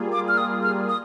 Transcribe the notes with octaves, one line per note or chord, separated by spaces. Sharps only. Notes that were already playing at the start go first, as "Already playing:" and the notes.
Already playing: G3 A#3 F4 G#4
D6
F6
D#6
F6
D#6